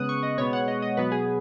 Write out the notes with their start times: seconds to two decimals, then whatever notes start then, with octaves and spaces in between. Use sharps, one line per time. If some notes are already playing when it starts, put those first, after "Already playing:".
Already playing: C#3 G#3 B3 D#6 F#6
0.09 C#6
0.23 D#5
0.38 B2 G#3 B3 C#5
0.53 F#5
0.68 D#5
0.82 D#5
0.97 B2 F#3 B3 B4
1.12 G#4